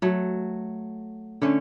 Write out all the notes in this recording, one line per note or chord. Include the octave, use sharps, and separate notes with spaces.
F#3 A3
D3 A3 C#4